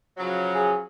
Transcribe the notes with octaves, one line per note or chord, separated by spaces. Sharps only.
C#3 F3 F#3
G#4